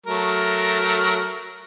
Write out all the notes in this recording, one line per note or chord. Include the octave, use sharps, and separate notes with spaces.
F#3 A3 A#4